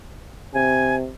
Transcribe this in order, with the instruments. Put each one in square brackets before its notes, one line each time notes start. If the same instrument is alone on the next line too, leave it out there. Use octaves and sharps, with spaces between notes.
[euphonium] C3 [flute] G#5